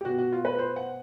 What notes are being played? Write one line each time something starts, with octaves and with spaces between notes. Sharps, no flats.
G4
B2 F#4
F#4
F4
B4
C5
F#5